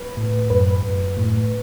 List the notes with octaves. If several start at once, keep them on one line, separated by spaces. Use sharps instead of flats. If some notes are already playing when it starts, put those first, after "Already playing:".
Already playing: B4
A2
F#2 B4
F#2
A2